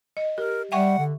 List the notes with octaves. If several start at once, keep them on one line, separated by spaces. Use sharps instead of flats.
D#5
G4 A#4
G3 E5 F#5 G5 C#6
D3